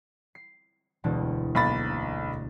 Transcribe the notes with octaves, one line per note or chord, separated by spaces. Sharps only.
C7
E1 D2 D4
B1 A#3 B5 A6